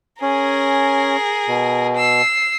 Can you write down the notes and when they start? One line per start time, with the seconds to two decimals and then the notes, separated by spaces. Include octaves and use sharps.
0.22 C#4 G#4 A#4
1.48 B2
1.96 E6 C7